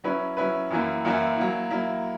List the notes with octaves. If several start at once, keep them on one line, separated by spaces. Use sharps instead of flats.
F#3 C#4 E4 B4
F#3 C#4 E4 B4
F#2 E3 A#3 E4
F#2 E3 A#3 E4
F#3 A#3 E4
F#3 A#3 E4